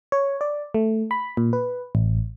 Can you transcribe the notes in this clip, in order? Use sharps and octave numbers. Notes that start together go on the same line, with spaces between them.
C#5
D5
A3
B5
A#2
B4
A1